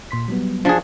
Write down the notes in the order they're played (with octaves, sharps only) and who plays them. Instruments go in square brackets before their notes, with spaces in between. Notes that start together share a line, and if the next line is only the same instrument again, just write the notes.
[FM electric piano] A#2 C6 B6
F#3 G3 B3
[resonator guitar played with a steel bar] G2 D4 F#4 [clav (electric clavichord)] F3 G#4